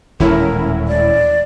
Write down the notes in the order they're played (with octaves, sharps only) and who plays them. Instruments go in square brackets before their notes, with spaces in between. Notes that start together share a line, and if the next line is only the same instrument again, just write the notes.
[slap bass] D#1 E3 G#3 [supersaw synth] A2 C#4 E4 [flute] A#4
[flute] D5